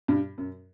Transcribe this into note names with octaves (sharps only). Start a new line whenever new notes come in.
G2
F#2